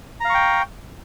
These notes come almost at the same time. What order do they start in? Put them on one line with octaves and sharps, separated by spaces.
A#5 F5 C#6 G5